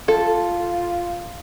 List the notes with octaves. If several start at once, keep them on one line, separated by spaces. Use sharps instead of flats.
F4 A4